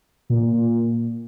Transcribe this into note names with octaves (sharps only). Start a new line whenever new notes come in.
A#2